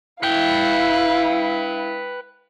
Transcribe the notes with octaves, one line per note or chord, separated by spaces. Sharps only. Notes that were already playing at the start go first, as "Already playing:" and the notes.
E4 B4 F5 G5